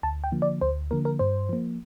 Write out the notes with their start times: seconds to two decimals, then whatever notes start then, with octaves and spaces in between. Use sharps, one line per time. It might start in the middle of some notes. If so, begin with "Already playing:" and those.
0.03 D2 A5
0.24 G5
0.32 D3 F3 A#3
0.42 D5
0.61 D2 C5
0.91 D3 F3 A#3 A#4
1.05 A#4
1.19 G2 C5
1.49 F3 A#3